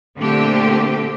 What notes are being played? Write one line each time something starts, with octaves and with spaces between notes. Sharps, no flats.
A#2 D3 A3 A#3 C4 G4